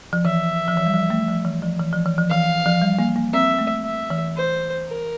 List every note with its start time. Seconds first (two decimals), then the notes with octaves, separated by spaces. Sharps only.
0.13 F3
0.25 E3 E5
0.68 F3
0.77 E3
0.86 G3
0.94 F3
1.10 A3
1.28 F3
1.45 E3
1.62 F3
1.80 E3
1.93 F3
2.05 E3
2.18 F3
2.30 E3 F5
2.66 F3
2.81 G3
2.99 A#3
3.16 A#3
3.33 C4 E5
3.58 A3
3.85 E5
4.10 E3
4.36 C5
4.87 A#4